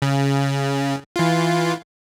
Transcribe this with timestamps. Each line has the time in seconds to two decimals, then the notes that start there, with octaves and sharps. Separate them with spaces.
0.02 C#3
1.16 E3 F4